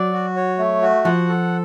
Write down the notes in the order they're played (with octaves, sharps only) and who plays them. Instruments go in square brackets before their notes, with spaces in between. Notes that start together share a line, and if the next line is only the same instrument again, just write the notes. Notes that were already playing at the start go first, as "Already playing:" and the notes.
Already playing: [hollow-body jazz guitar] F#3 [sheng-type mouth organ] D5
[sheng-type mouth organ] F#4
C#5
A3
F#4
[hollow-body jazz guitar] F3 [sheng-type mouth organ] F#5
[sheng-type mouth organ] A4